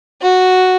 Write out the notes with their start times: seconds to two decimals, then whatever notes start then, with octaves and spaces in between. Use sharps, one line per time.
0.22 F#4